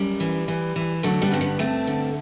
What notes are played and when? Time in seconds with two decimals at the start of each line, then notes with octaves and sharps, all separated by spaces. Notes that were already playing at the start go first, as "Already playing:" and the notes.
Already playing: F#2 G3
0.20 E3
0.48 E3
0.76 E3
1.03 D3 F#3 A3
1.22 G3 B3
1.31 G2 C4
1.41 G3 B3
1.59 G2 A3 C4
1.87 D3